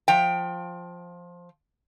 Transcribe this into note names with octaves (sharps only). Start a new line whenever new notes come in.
F3 G5